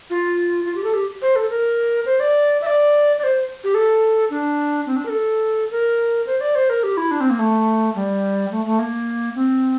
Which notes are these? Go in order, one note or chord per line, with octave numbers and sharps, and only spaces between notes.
F4
F4
G4
A4
G4
C5
A4
A#4
C5
D5
E5
D5
D5
C5
G4
A4
D4
C4
D4
A#4
A4
A#4
C5
D5
C5
A#4
G4
E4
D4
C4
A#3
A3
G3
A3
A3
A#3
C4